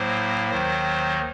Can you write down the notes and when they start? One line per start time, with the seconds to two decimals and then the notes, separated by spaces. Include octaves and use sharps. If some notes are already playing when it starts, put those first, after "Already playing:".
Already playing: A2 F#3 A#3 C5
0.50 D#2 D#3 F#3 C5